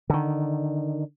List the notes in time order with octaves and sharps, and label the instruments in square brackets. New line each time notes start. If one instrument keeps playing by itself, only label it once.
[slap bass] D3 D#3